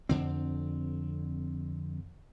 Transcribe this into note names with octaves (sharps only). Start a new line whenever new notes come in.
F2 D3 C4